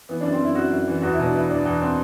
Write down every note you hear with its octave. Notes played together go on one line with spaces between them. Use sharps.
E3 B3
F#2 D4
C4
F#2 E4
F#2 F#4
F#2
E3
E2 F#4
E4
B2 D4
E2 E4
E2 D4
E2
C4